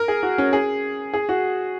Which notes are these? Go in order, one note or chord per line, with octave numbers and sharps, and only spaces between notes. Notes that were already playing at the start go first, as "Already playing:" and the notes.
Already playing: A#4
G#4
F#4
C#4
G#4
G#4
F#4